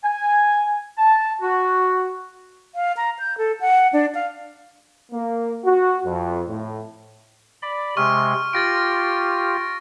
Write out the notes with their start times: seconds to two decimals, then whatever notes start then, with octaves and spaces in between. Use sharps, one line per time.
0.05 G#5
0.98 A5
1.42 F#4
2.75 F5
2.97 A#5
3.19 G6
3.38 A4
3.61 F#5
3.93 D4
4.15 F5
5.12 A#3
5.64 F#4
6.06 F2
6.49 A2
7.62 D5 B5
7.97 C3 G#3 C#6 F6
8.53 F4 G4 A6 A#6 D7